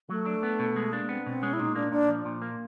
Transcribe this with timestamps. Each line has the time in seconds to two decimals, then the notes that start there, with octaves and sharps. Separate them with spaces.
0.10 F#3 A3
0.26 D4
0.43 B3
0.59 B2
0.76 G#3
0.92 A#3 D4
1.09 B3 C4
1.26 B2 C4
1.42 G#3 C#4
1.53 E4
1.59 A#2 D#4
1.75 A#3 D4
1.92 A#2 D4
2.09 F3
2.25 A#2
2.42 A#3